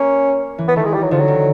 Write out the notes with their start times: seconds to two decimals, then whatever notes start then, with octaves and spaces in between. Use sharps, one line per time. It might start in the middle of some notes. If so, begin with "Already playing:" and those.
Already playing: A#3 C#4
0.58 E3
0.68 B3
0.76 D#3 A3
0.85 G#3
0.93 G3
1.02 F#3
1.11 D3 F3
1.19 F#3
1.28 D#3